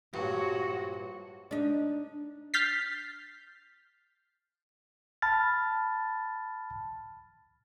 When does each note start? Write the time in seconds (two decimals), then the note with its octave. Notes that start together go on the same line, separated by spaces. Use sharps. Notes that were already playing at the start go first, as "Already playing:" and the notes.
0.14 A#1 G2 F#4 C#5
1.51 D4 D#4
2.54 F6 G6 A6 B6 C7
5.22 A5 B5 F6 A6